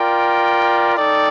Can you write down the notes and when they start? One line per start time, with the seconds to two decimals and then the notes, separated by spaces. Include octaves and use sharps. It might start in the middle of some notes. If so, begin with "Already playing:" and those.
Already playing: F4 A#4 D5 G5
0.95 D#4 A4 D5 G5